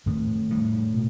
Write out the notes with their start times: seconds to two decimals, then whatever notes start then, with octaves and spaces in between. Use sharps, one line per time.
0.06 A2 D#3
0.50 A2 G3
0.94 B2